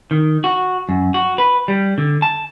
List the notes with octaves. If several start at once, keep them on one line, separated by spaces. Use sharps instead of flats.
D#3
F#4
F#2
F#4
B4
G3
D3
A5